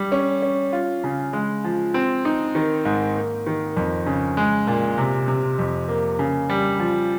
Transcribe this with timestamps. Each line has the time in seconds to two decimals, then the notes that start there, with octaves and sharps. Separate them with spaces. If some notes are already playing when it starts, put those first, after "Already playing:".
Already playing: G3
0.12 C#4
0.42 C#4
0.73 F4
1.04 C#3
1.33 G#3
1.64 F3
1.94 C4
2.25 D#4
2.55 D#3
2.85 G#2
3.16 A#3
3.46 D#3
3.77 F2
4.06 C#3
4.37 G#3
4.67 A#2
4.98 C3
5.28 C3
5.59 F2
5.88 A#3
6.19 C#3
6.50 G3
6.80 F3